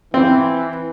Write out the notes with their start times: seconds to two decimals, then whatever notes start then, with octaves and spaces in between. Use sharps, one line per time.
0.14 E3 C4